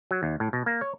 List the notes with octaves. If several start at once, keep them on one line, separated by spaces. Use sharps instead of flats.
F#3
D#2
A2
B2
A#3
C#5